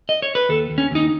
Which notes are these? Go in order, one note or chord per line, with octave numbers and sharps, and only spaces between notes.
D#5
C#5
B4
D#2 A4
D#2
C#4
D#2 D#4